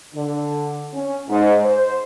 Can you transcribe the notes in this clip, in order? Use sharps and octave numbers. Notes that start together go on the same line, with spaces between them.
D3
C#4
G#2
C5